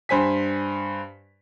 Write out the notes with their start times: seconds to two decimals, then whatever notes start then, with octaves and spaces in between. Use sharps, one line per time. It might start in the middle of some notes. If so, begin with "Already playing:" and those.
0.09 G2 C5 G#5 B6